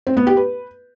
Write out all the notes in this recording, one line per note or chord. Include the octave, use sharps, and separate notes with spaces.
C4
B3
G4
B4